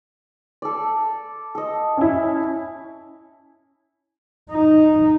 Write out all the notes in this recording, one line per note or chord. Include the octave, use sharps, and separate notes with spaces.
A4 D5
A4 D#5
C#4 E4
D#4